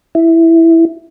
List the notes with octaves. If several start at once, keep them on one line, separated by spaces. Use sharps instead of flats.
E4